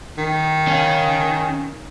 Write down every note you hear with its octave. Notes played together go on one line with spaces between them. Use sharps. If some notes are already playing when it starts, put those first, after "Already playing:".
D#3
C#4 F5